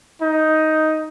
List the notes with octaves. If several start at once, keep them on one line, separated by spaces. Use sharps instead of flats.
D#4